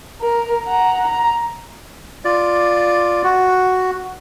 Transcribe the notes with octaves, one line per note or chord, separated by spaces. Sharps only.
A#4
F#5 A#5
A#5
F4 D5
F#4